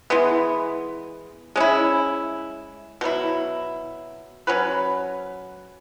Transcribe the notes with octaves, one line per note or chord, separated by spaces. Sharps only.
E3 G#3 B3
G#3 C#4 E4
B2 F#3 E4
F#3 C#4 F#4 B4